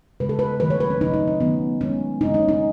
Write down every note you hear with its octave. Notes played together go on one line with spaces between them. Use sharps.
C#3 G#3 B4
A4
B4
D#3 F#3 A3 B4
C#5
B4
C#4
C#3 F#3 A3 D#4
D#4
C#4
D#3 F#3 A3 B3
D#3 G#3 C#4
C#3 G#3 D#4
C#4
D#4